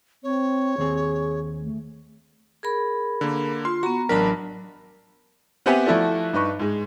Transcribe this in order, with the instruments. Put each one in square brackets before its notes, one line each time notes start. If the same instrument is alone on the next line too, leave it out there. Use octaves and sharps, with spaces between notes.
[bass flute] C4 [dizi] C#5
[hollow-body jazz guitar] D#2 C4 [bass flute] G#4
[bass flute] A3
[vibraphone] G#4 A#4 B5
[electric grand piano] D3 A#3
[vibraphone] F4 [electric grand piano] C6
[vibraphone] B3 A#5 [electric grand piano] F#4
[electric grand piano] A1 D4 A#4 [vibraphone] F#3 A5 B5
[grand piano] B3 C4 G4 E5 F#5 G#5
F3 A3 E4 F#4 A4 D5
G2 D#4 B4 C#6
G#2 G#3